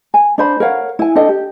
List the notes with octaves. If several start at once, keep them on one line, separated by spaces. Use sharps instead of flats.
G#5
D4 C5 B5
A#4 C#5 F5 F#5
E4 G#5
D4 A4 D#5 G5
G4